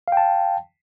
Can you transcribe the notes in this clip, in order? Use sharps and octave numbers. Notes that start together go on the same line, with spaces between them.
F5 G5 A5